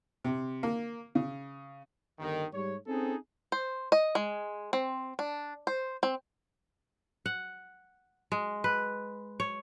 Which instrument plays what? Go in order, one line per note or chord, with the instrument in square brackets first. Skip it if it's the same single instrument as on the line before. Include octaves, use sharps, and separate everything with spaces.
[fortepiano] C3
A#3
C#3
[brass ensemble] G1 D#3
G#2 G3 C#5
C4 C#4 D#4 G#4 A4
[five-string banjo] C5
D#5
G#3
C4
D4
C5
C4
[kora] F#5
G#3
B4
C#5